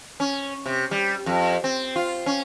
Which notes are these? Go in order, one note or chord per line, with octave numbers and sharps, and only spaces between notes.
C#4
C3
G3
F2
C4
F4
C#4